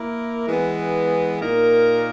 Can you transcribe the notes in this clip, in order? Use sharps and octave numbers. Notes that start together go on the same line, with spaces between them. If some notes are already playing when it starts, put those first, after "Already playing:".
Already playing: A#3 E4 A#4
E3 G#3 B3
A#2 A#3 D#4 A#4